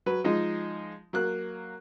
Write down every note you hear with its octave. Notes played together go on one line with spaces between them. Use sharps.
F#3 B4
F3 G#3 D#4
F#3 A#3 F#6